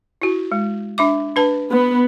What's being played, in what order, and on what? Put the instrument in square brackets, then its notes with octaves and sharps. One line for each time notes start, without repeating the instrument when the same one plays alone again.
[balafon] E4 F#4
G#3
D4 E5 D6
D4 B4 A5
[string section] B3